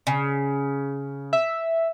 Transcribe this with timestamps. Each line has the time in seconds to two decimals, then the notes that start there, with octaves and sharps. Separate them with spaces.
0.07 C#3
1.33 E5